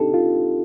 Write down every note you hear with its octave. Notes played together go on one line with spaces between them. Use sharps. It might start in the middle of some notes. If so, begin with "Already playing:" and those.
Already playing: C4 D4 D#4 G4 A4
F4